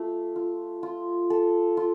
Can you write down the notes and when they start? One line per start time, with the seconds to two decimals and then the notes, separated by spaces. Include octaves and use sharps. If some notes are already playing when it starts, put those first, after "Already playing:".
Already playing: A3 F4
0.36 F4
0.83 F4
1.30 A4
1.77 F4